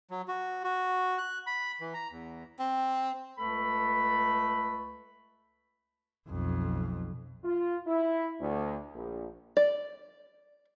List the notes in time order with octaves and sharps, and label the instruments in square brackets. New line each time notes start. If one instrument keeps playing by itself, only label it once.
[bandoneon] F#3
F#4
F#4
F#6
B5
E3
A#5
E2
[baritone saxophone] C4
[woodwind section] C#2 A3 A4 B4 B5
[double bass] B1 F2
[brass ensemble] F4
E4
D2
A#1
[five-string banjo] D5